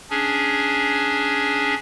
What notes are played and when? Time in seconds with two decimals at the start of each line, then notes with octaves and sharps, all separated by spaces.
0.10 C#4 D4 G#4